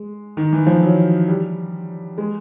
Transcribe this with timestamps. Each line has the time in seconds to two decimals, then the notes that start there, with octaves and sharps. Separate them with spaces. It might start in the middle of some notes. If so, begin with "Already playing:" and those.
Already playing: G#3
0.37 D#3
0.53 E3
0.66 F3
0.83 F#3
1.28 G3
2.18 G#3